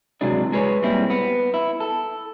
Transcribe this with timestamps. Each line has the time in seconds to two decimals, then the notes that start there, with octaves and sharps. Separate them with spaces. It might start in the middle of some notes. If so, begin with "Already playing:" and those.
0.21 C3 E3 F#3 G#3 D4
0.52 G#3 G#4 B4 C#5
0.82 A#2 G3 C4 E4
1.10 B3
1.54 E4
1.80 A4